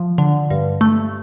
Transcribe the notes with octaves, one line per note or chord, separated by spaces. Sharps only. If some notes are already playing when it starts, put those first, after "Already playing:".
Already playing: F3
D3
G2
A3